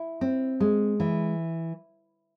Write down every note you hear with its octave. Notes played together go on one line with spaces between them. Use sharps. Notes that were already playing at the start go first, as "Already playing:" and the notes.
Already playing: E4
C4
G#3
E3